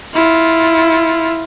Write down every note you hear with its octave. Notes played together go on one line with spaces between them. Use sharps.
E4 F4